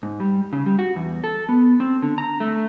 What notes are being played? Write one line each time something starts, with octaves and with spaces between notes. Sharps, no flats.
G#2
G3
C#3
G3
F#4
E2
A4
B3
C4
D3
A#5
A3